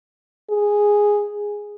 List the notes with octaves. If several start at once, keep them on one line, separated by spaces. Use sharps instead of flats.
G#4